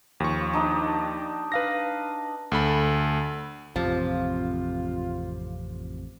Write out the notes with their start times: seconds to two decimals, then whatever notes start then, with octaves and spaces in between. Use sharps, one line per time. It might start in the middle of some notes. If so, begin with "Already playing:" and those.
0.20 D#2 F3 C#6
0.53 D4 D#4 G4
1.52 B4 F5 A#6
2.52 D2 A4 B5
3.76 A1 F2 A2 C3 F3 F4